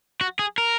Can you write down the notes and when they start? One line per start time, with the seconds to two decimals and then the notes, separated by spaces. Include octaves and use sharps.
0.21 F#4
0.39 G#4
0.58 A#4